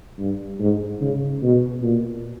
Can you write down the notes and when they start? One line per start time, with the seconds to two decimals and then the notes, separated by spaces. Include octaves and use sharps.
0.19 G2
0.60 G#2
1.01 C#3
1.42 B2
1.82 A#2